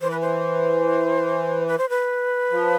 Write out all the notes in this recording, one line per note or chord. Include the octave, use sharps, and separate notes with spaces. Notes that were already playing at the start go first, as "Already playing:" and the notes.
E3 C5
B4
C5
B4
C5
B4
F3